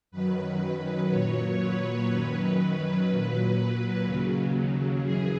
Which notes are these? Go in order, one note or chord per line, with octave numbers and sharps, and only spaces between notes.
F#2 D#3 F#3 B4
A#2 F#3 C#5
B4
F#2 D#3 F#3 B4
A#2 F#3
B4
D#2 C#3 F#3
F#2 E3 G#4